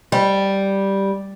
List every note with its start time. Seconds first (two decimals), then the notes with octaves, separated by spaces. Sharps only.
0.12 G3